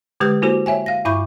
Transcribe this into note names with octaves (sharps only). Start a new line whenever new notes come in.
D3 G#3 G4 B4 D#6 G6
A#3 E4 F#4 A4 C5
C#5 E5 G5 G#5
F5 A#6
G2 E4 E5 B5 C#6 G6